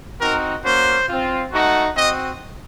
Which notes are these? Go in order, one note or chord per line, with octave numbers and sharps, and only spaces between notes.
C4 D#4 F#4 A#4
A#3 C#4 F#4 C5
C4 F4
A3 D#4 F#4
C4 F#4 D#5